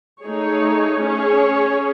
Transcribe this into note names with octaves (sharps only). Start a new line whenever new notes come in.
A3 D#4 G#4 C#5
C#4 G#4 C#5